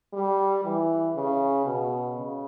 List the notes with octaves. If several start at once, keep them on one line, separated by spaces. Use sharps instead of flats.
G3
E3
C#3
B2
C#3